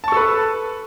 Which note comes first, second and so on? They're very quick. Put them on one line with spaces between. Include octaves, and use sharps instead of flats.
A5 C#6 A4 B4